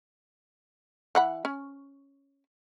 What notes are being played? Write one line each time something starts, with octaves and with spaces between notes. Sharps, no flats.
E3 F#5 B5
C#4